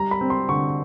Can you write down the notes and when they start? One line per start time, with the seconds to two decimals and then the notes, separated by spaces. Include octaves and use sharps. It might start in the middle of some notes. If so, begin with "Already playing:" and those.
Already playing: G3 A#5
0.11 B5
0.21 C4
0.30 C6
0.49 D3 C#6